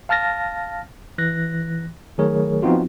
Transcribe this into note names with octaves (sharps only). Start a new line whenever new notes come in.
F5 A5 F6 A6 A#6
E3 F#6 A#6
D#3 F#3 A3 G#4 A#4 C#5
F3 B3 C4 D#4 F4 F#4